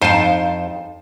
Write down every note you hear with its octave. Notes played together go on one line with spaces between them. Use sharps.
F2 D#4 F4 C5 A5